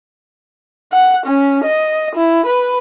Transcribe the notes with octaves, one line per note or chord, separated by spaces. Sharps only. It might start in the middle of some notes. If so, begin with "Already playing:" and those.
F#5
C#4
D#5
E4
B4